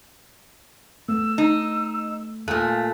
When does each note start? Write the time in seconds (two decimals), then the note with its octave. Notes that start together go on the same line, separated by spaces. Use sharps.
1.09 A3 B3 E6
1.38 D#4
2.48 A#2 A3 F5 G#5 F#6